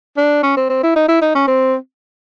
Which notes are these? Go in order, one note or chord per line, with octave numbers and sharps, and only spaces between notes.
D4
C#4
C4
C4
E4
D#4
E4
D#4
C#4
C4